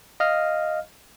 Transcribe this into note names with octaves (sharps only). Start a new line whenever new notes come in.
D#5 F5 F6